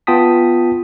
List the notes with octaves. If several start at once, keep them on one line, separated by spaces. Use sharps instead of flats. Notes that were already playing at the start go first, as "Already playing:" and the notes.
B3 F4 G5 A5 D#6 B6